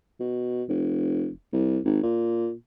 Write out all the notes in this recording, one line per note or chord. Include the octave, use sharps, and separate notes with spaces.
B2
F1
C2
G#1
A#2